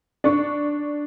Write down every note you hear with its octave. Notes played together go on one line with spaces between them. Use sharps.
D4 C#6